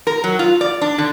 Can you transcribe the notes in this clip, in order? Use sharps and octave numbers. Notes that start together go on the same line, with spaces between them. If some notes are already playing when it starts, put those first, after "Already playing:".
A#4
F#3
F4
D5
D4
D3